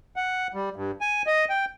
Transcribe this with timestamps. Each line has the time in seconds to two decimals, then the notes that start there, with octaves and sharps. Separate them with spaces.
0.16 F#5
0.54 G3
0.76 G2
1.01 G#5
1.27 D#5
1.50 G5